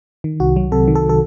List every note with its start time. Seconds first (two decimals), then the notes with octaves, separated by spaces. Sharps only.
0.24 D#3
0.40 C2 F#4
0.56 F#3
0.72 C3 A4
0.88 D#3
0.95 A4
1.09 A4